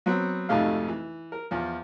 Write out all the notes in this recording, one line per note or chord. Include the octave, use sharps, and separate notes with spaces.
F#3 B3 C4
G#1 F2 C3 A3 D#4 F5
E3
A#4
E2 F3